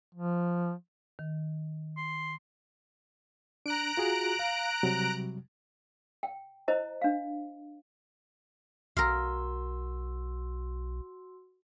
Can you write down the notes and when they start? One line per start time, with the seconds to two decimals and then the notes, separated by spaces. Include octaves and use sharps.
0.14 F3
1.19 D#3
1.97 C6
3.66 D4 A#5 F#6 D7
3.97 F4 F#4 G#4
4.39 F5
4.83 C3 F#3 G3
6.23 G5
6.68 E4 C5 D#5 A#5
7.02 D4 F5
8.97 B1 F#4 A#4 F5 C6 E6